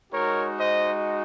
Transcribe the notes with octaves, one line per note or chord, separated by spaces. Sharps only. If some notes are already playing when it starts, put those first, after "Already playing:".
G#3 D#4 F#4 A#4 C#5
C5 D#5